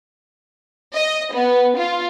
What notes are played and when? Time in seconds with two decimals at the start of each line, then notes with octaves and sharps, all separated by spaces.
0.94 D#5
1.34 B3
1.78 F4